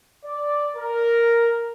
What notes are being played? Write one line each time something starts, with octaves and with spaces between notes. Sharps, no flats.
D5
A#4